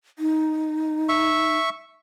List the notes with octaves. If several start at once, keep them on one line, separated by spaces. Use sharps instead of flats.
D#4
E5 C#6